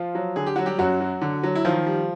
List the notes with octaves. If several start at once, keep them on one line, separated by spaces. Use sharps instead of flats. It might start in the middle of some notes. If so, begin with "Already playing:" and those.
Already playing: F3 F4
F#3
D3 G#4
G4
F#3 F#4
G3 G4
F#2 F#3 F#4
F#3
D3
F#3
E4
D#3 F3 F4
G3